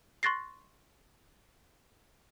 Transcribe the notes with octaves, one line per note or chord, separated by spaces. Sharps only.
C6 C#6 F#6 A6 A#6 C7